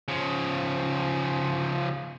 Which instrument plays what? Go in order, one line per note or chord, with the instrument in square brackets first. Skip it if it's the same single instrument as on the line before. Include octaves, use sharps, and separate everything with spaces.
[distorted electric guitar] C#3 F3